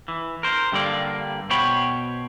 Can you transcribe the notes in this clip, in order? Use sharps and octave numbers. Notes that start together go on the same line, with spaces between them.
E3
A#4 C5
G2 D3 G3 A#3 D5
B2 C5 C#5 G5 B5